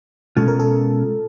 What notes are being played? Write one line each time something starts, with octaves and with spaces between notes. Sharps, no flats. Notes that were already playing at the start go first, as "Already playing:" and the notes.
B2 G#3 C#4 F4 A4
A#4
A4